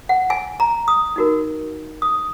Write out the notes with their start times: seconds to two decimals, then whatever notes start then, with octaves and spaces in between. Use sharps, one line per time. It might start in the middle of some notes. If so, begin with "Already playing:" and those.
0.09 F#5
0.30 G#5
0.60 A#5
0.88 D#6
1.16 D#4 F#4 A#4
2.02 D#6